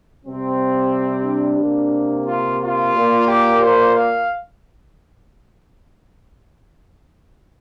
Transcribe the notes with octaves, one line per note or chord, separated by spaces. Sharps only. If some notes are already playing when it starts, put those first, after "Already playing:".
C3 G3 C4
D4
C3 A#3
F4
F4
A#2 A#3
G4
C5
F5